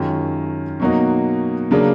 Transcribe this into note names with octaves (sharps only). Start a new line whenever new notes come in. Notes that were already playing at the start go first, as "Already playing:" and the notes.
Already playing: F#2 D#3 G#3 C#4 F4
B2 F#3 A#3 D#4 F#4
C#3 F#3 A#3 D4